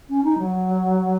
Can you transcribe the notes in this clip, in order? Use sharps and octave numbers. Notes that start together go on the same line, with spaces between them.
C#4
D#4
F#3